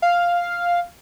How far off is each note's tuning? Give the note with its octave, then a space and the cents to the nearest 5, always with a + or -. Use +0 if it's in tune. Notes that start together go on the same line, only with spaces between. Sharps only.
F5 +0